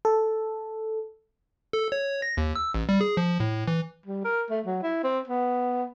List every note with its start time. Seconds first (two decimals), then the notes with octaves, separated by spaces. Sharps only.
0.05 A4
1.73 A4
1.92 C#5
2.22 A#6
2.37 D#2
2.56 E6
2.74 A1
2.89 G3
3.01 G#4
3.17 F3
3.40 A2
3.68 E3
4.06 G3
4.25 A#4
4.50 A3
4.66 F#3
4.83 E4
5.04 C4
5.28 B3